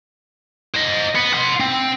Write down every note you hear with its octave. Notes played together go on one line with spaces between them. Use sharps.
C5 D#5
B3
F#5 C6
C4